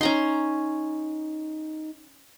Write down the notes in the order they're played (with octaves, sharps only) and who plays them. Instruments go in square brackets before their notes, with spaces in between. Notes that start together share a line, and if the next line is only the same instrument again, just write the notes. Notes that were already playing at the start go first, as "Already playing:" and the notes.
[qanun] C#4 A#5 C6 [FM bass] D#4